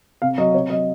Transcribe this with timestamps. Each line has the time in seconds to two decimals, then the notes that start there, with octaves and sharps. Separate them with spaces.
0.22 C3 F5
0.38 F#3 D#5
0.54 C3 C#5
0.70 F#3 D#5